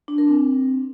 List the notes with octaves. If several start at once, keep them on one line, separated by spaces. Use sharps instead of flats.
D4
A#4
C4